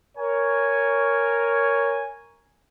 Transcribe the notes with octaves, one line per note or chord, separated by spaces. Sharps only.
A#4 C#5 G#5